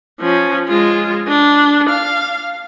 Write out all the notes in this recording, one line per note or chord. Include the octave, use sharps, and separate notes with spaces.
F3 C#4
G#3 F4
D4
F5